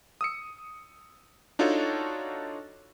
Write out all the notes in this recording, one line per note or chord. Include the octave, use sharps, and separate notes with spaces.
D#6 E6 C#7
D4 D#4 F4 F#4 A4 C#5